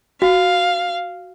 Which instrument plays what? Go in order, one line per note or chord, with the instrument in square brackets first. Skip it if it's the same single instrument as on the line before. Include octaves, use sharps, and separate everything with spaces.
[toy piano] F#4 [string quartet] F5